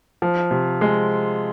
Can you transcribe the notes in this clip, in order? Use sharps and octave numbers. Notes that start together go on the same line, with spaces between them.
F3
C3
G#3